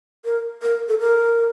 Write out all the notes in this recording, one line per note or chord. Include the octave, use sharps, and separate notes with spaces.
A#4
A#4
A4
A#4